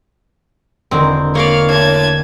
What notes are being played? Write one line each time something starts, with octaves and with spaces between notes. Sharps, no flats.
E1 D3 C4 A#4
A#3 C#5 D5 F5
D#2 A2 A5 G#6